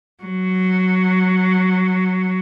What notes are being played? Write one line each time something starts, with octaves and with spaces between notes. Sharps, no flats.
F#3